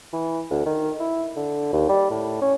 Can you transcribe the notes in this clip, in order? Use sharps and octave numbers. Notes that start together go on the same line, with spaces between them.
E3
D2
D#3
E4
D3
D#2
G3
A2
C#4